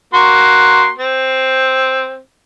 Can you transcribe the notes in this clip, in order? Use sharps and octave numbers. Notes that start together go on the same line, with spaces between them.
A#3 F#4 C6
C4